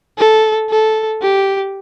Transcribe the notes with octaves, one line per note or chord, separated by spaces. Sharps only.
A4
A4
G4